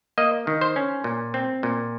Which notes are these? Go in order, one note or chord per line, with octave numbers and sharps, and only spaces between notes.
A#3 D#5
D#3
C5
C#4
A#2
C4
A#2